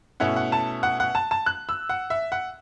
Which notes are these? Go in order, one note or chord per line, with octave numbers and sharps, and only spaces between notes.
B2 A3 C#4 E4 F#5
F#5
A5
F#5
F#5
A5
A5
F#6
E6
F#5
E5
F#5